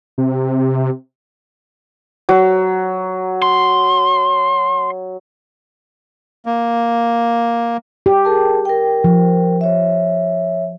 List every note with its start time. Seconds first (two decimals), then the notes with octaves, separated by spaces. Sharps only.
0.18 C3
2.29 F#3
3.42 C6
6.46 A#3
8.06 G4
8.25 G#4 A#4 A5
8.65 A#4 G5
9.04 F3
9.61 C#5 E5